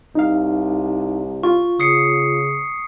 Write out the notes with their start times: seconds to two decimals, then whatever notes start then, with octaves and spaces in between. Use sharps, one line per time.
0.15 C2 D#4 F5
1.43 F4 C#6
1.80 C#3 D#6 C7 C#7